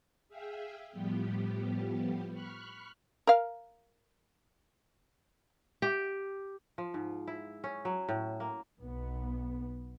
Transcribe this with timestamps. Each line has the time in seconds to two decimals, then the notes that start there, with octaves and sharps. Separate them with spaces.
0.29 G#4 E5 F5 G5
0.91 A2 F3 G3 B3 G4
2.32 B5 C#6 F6 F#6
3.27 A#4 F5
5.82 G4
6.78 F3
6.94 G#2
7.27 E4
7.64 C#4
7.85 F#3
8.09 A2
8.40 A#3
8.79 B1 B3